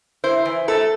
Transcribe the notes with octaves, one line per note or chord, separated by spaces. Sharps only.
E4 C5
E3
A3 A4